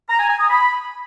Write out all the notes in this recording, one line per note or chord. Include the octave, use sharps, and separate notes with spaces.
A#5
G#5
G#5
D#6
B5